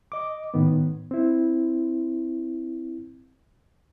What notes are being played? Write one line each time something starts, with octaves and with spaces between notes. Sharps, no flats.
D#5 D6
A2 D#3 B3
C4 E4